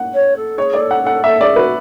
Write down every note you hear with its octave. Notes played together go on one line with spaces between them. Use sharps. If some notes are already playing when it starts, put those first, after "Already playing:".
Already playing: F#5
C#5
A4
G#4 C#5
D5
A4
F#5
A4 F#5
A4 E5
G#4 D5
F#4 B4